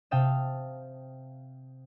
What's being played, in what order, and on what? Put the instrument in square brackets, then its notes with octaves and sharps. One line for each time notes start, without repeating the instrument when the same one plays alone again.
[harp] C3 F5 G5 A5 D#6 E7